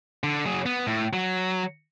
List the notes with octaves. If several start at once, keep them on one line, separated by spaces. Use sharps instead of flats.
D3
F#3 G#4
B3
A2
F#3